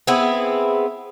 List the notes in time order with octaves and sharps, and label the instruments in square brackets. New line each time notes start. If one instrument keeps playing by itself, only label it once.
[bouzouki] B3 C4 E4 G#4